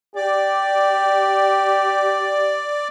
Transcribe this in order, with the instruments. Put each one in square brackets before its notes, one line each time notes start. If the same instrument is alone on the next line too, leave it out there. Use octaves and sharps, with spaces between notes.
[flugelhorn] G4 [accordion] D5